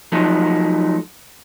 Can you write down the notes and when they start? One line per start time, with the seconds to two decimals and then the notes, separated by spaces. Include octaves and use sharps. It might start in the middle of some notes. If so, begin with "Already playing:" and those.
0.12 F3 F#3 A3 D#4